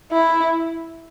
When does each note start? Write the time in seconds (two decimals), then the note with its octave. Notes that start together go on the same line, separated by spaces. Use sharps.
0.12 E4